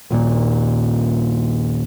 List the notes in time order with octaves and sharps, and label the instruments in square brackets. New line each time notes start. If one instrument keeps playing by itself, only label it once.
[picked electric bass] A#1 D#2 A#2